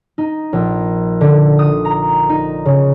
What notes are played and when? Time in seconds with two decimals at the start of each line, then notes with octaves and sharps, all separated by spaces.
0.18 D#4
0.53 A#1
1.21 D3
1.59 D#6
1.85 A#5
2.29 D#4
2.66 C#3